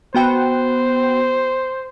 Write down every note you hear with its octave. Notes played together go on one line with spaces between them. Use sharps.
B3 F#4 C5 G5